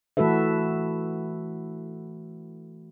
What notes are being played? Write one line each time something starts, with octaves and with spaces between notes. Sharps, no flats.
E3 A3 F#4 A4 B4 E5